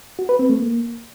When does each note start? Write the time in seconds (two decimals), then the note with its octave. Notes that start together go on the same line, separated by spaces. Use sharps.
0.19 F#4
0.29 B4
0.39 C4
0.49 A3
0.60 A#3